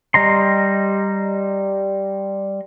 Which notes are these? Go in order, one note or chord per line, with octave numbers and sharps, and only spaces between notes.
G3 D#5 A#5 C6